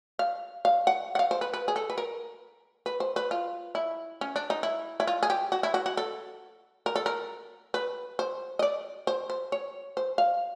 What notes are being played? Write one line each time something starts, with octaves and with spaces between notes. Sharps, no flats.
F5
F5
F#5
F#5
F5
C5
B4
B4
G#4
A4
B4
A#4
B4
C5
B4
F4
E4
C#4
D4
D#4
E4
E4
F4
G#4
G4
F#4
E4
F#4
F#4
A4
A#4
A4
A#4
B4
C5
D#5
D5
C5
C5
C#5
C5
F5